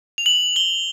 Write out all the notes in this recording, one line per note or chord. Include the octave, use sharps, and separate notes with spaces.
F7
F#7
G7